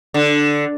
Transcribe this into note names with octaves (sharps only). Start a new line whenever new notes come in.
D3